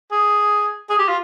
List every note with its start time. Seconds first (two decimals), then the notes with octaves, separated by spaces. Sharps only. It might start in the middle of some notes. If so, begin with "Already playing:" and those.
0.12 G#4
0.90 G#4
0.99 G4
1.08 F4